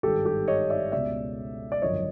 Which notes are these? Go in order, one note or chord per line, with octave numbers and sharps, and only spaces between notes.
G#1 G2 D#3 G4 A4
G4 A4
C#5 D#5
D5 E5
C#2 B2 D5 E5
D5
G#1 F#2 D3 F3 C#5 D#5